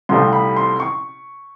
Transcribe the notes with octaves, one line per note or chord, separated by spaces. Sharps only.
C2 C3 F3 A3 C4 C6
B5
C6
C#6